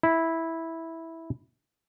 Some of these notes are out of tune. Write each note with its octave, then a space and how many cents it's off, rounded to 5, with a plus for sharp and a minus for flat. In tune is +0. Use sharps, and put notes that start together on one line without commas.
E4 -10